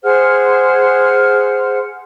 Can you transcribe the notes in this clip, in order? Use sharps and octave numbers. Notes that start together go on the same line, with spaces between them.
G#4 C5 F#5 F6